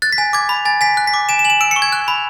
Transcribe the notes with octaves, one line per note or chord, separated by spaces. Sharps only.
F#6 A6
B6
G#5
D6 G#6
B5
G#5 A6
G#5 B6
F#6
B6
D6
G#5 E7
E7
G#5 F#7
E7
E6 D7
C#7
C#6
G#6
F#6
B5